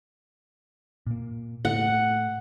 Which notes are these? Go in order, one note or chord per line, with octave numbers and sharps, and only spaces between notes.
A#2 A#3
A2 A3 F#5